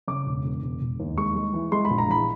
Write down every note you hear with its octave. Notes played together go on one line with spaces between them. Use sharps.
C#3 D6
E1
E1
E1
E1
D#2
G#3 C#6
G#3
E3
G#3 C6
B5
A#1
A#5
E3 B5